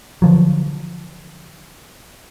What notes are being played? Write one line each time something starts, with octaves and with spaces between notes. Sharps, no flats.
D3 F3 F#3